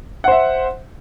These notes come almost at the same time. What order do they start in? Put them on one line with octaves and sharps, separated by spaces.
F#5 C5 E5